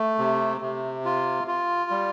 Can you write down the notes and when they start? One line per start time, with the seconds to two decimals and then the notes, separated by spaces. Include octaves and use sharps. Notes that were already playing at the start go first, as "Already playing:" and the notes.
Already playing: A3
0.18 C3
0.61 C3
1.05 F4
1.47 F4
1.90 G3